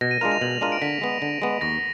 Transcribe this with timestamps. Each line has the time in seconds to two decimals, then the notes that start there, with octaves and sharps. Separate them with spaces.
0.01 B2 A#6
0.11 D#7
0.21 G#3 D4 F4 A#4 F7
0.31 F7
0.41 B2 F#7
0.51 F7
0.61 G#3 D4 F4 A#4 D#7
0.72 D7
0.82 D3 B6
1.01 G#3 B3
1.22 D3
1.42 G#3 B3
1.61 D#2 A#6